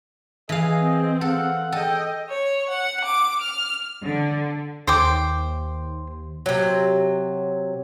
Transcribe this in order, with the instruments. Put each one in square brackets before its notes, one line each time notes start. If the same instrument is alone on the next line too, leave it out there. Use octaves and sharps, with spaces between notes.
[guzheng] E3 F5 [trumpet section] G#4 D#5
[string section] C4
[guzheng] A4 [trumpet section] F5 F#5
[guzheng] A4 [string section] D#5 [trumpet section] G5
[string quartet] C#5
F#5
D6
F6
[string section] D3
[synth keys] D#2 [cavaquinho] C5 G5 D6
[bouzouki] C3 F#3